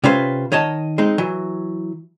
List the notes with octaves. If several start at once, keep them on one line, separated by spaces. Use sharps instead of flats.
C3 C#4 F4 B4 C5
D#3 C#5 D#5 A5
G#3 C4 D#4
E3 F#3